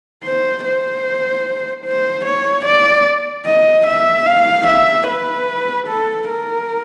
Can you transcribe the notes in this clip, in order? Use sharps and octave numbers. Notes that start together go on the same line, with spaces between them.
C5
C5
C5
C#5
D5
D#5
E5
F5
E5
B4
A4
A#4